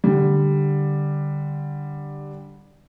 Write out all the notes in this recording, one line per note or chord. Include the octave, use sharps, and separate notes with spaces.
D3 G3